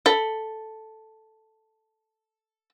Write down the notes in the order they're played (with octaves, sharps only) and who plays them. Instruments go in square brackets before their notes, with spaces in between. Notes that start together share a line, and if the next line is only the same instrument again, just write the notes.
[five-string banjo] A4 B5